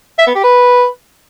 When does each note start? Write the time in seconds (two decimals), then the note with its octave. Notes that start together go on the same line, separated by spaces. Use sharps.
0.18 E5
0.27 B3
0.35 G4
0.44 B4